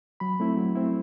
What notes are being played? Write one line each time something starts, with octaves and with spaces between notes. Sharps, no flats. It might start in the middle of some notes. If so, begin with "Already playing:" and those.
F#3 B5
A3 C4 E4
F#3
A3 C4 E4